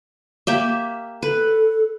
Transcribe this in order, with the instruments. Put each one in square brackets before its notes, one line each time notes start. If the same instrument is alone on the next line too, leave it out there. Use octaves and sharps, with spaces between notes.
[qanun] A#3 G4 E5
[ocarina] A4 [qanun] B4